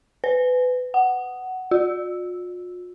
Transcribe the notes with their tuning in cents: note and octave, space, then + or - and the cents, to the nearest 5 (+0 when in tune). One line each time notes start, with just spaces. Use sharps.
B4 +25
F#5 +10
F4 +45